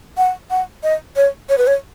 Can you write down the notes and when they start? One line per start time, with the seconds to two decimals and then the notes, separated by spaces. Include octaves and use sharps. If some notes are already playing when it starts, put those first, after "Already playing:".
0.18 F#5
0.50 F#5
0.83 D#5
1.16 C#5
1.49 C#5
1.58 B4
1.67 C#5